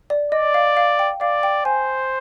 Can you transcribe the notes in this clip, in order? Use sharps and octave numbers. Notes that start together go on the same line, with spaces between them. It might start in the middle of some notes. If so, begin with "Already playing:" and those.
D5
D5 D#5
F5
F5
G5
D5 F5
G5
C5 G#5